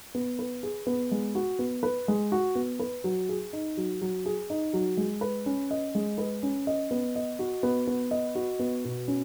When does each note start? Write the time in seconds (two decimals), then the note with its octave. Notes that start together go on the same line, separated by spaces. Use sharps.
0.15 B3
0.39 B4
0.63 G#4
0.87 B3
1.11 G#3
1.35 F#4
1.59 B3
1.83 B4
2.08 G#3
2.32 F#4
2.55 B3
2.80 B4
3.04 F#3
3.29 G#4
3.53 D#4
3.77 F#3
4.02 F#3
4.26 G#4
4.50 D#4
4.73 F#3
4.97 G#3
5.21 B4
5.46 C#4
5.71 D#5
5.95 G#3
6.18 B4
6.43 C#4
6.67 D#5
6.91 B3
7.16 D#5
7.39 F#4
7.63 B3
7.87 B3
8.11 D#5
8.35 F#4
8.59 B3
8.85 B2
9.08 C#4